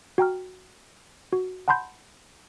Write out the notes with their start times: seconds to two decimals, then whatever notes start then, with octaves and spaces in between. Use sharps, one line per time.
0.18 F#4 G5 A#5 F6
1.33 F#4
1.68 F#5 A5 B5 C6 G6